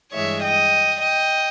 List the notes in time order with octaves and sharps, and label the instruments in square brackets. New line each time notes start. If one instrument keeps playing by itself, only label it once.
[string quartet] G2 E3 G#3 C#5 E5
D#5 G5
D#5 G5